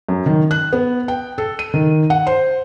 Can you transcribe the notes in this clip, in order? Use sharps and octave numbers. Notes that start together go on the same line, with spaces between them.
F#2
D#3
F#6
B3
G5
A4
D#7
D#3
F#5
C5